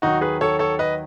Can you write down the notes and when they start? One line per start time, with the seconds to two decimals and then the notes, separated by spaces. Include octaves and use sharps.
0.02 D#2 D#3 F#3 D#4 F#4
0.21 G#4 B4
0.41 A4 C#5
0.59 A4 C#5
0.79 B4 D#5